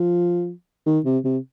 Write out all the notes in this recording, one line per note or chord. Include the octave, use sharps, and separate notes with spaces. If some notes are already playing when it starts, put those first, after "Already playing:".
Already playing: F3
D#3
C3
C3